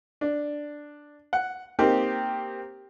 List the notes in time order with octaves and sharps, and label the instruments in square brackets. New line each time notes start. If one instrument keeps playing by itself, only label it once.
[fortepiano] D4
F#5
A#3 C4 D#4 G4